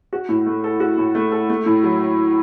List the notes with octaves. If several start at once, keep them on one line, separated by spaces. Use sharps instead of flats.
F#4
A2
A3
A4
F#4
A2
A3
A4
A3
A2
F#3